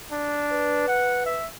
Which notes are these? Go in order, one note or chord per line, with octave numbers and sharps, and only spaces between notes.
D4
B4
F#5
E5